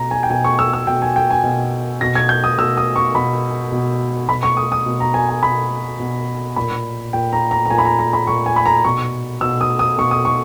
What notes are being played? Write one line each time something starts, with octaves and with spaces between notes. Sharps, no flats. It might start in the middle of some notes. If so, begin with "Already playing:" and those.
Already playing: B2 A#5
G#5
G5
B2 G#5
C#6
E6
E6
B2 G5
G#5
G5
G#5
B2
B2 A#6
G#6
G6
D#6
B2 E6
D#6
C#6
B2 B5
B2
B2 B5
C#6
D#6
D#6
B2
A#5
G#5
G#5
B2 B5
B2
A#2 B5
A#2 G5
A#5
A#5
A#5
A#2 G#5
B5
A#5
A#5
B5
A#2 C#6
G#5
B5
A#5
B2 C#6
B2 E6
D#6
D#6
B2 C#6
D#6
C#6